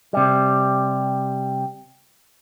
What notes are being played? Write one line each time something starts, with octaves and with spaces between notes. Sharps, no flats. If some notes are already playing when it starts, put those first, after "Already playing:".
C3 G3